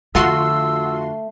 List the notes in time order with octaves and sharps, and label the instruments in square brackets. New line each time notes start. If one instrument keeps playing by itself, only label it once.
[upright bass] F2 D3 [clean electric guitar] A3 [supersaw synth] F4 F#4 C6 [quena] E6